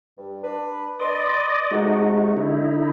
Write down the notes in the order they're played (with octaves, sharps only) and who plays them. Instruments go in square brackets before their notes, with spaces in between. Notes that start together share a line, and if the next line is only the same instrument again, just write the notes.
[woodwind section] G2
D4 B4
[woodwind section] B4 C6 [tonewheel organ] D5 D#5
[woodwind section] C3 A3 [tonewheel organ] G#3 D#4 F#4
[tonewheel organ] D3 D#4 E4